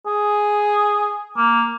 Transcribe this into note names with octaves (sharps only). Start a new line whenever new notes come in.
G#4
A#3